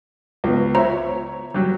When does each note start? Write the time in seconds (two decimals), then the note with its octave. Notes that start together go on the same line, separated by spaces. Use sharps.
0.44 C#2 B3
0.75 F4 C5 C#5 E5 A#5
1.54 F#3 G3